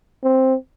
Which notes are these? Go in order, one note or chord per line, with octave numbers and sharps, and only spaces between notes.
C4